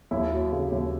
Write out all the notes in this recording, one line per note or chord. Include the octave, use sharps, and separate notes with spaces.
D#2 E4
F#3
C#3
D#2